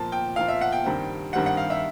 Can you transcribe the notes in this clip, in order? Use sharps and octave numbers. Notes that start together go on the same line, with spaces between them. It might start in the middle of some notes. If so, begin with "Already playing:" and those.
Already playing: A#2 F3 A#3 A5
G5
A#2 F3 A#3 F5
E5
F#5
G5
G2 D#3 G3 C4
G2 D#3 G3 C4 F#5
F#5
F5
E5